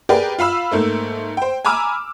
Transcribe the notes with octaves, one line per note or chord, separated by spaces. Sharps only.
G4 G#4 A#4 B4 D5 G5
F4 F5 B5 E6
G#2 A3 A#3
C5 G5
G#5 A#5 B5 D6 E6 F6